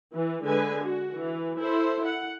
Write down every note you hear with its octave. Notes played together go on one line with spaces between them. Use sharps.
E3
D3 G#3 B4 G#5
F#4
E3
E4 A4 C5
F#5